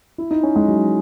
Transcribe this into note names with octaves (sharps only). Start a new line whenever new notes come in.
E4
D#4
C#4
G#3
F#3